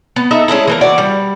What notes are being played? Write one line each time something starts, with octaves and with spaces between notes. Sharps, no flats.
B3
D#4 A4 D#5 E5
G#3 C#4 D4 E4
E3 A#3 A#4
E4 F#4 D5
G3